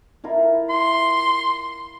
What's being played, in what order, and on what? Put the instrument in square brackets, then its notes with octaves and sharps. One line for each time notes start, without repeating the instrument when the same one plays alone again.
[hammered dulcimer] E4 F4 A#4
[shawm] C6